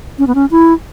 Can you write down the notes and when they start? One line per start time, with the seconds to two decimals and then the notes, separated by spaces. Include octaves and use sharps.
0.19 C#4
0.27 B3
0.35 C#4
0.51 E4